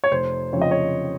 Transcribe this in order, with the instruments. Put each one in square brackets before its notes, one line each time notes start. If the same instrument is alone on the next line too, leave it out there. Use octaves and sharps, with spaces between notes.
[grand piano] C#5
F1 C5
F2 C#3 F3 C4 C#5
D#5
C#5